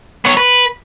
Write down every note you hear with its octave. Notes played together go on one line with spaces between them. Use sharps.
B3 C#5
B4